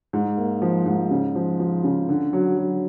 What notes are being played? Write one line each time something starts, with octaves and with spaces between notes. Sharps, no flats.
G#2
A#3
F3
G#2
C#3
F3
F3
C#3
D3
F#3
F#3